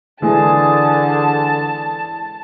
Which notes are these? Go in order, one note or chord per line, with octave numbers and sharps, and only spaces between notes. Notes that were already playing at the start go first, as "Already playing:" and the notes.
D3 E3 G#3 G#4 A5